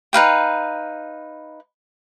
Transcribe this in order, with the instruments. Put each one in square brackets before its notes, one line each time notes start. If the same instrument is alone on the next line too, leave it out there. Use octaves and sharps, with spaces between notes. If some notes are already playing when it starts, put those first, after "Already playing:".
[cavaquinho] D#4 B4 F5 G5